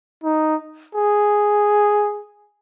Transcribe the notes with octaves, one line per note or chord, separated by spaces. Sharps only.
D#4
G#4